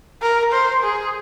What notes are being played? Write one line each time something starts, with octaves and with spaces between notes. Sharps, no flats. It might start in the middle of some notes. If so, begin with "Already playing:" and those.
A#4
C5
G#4